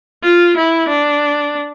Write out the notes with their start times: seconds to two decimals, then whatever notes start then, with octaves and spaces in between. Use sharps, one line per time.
0.24 F4
0.57 E4
0.89 D4